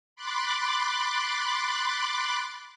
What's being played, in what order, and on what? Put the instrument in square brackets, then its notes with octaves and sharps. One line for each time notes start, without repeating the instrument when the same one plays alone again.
[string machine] B5 C6 D6 F#6 A6